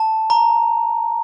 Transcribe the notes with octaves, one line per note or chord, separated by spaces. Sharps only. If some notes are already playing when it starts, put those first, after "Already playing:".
Already playing: A5
A#5